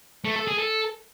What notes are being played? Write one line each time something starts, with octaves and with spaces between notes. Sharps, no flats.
A3
A4
G#4
A4